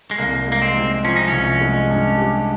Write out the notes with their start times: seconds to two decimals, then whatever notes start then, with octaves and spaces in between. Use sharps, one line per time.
0.11 G#3
0.18 C2 A#3
0.48 G#3 A#3
0.62 C4
0.76 C3
1.04 F3 C#4
1.16 D#4
1.28 C2 C#4
1.61 G#3
1.89 G2
2.18 G4